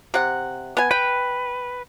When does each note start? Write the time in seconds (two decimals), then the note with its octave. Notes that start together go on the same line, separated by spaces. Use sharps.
0.14 C3 F#5
0.77 B3 G#5
0.91 B4 G5